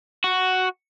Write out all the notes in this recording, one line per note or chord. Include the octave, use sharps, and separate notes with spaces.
F#4